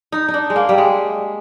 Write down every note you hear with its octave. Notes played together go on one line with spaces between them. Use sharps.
D#4
D#4
D4
G#3
A#3
G3
G#3